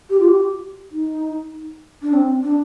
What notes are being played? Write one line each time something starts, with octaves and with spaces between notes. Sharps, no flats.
G4
F4
G4
D#4
D4
C4
D4